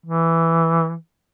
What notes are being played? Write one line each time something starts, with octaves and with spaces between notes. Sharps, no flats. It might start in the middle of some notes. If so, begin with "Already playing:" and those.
E3